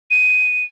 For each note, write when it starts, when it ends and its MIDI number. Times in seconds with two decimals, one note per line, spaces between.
0.10 0.64 99